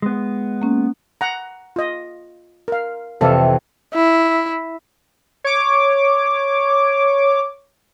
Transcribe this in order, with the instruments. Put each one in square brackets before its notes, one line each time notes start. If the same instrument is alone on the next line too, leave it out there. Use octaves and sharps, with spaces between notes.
[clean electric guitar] G#3 B3
[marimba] A#3 C#4
[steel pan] F#5 A#5
F4 D#5
A#4 F5
[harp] F2 C3 E3 [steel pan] A4 D5 F5
[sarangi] E4
[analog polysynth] C#5 D6